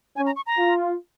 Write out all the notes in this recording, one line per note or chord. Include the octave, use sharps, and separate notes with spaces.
C#4 G#5
A#5
C#6
A#5
F4